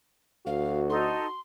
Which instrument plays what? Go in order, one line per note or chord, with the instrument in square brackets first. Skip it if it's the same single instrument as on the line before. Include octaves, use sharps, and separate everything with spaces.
[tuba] D2 [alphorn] F#4 [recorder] F5
[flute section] D#4 A4 [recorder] C6